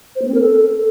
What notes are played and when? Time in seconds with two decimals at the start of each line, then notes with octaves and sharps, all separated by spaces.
0.16 C5
0.22 A#3
0.28 C4
0.34 A#4
0.41 A4